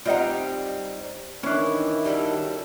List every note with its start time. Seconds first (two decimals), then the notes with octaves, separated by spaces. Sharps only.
0.06 G3 C4 D#4 F4 D#5 F#5
1.43 D#3 E3 C#4 D4 E4
2.05 F#3 G3 A4